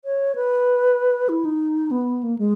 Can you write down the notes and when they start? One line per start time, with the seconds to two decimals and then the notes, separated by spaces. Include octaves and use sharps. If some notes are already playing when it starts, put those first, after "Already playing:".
0.05 C#5
0.35 B4
1.29 E4
1.45 D#4
1.91 B3
2.23 A#3
2.38 G#3